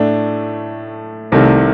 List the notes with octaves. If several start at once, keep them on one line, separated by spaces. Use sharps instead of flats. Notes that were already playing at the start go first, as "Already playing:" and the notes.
Already playing: A2 A3 D4
C2 C3 D#3 A3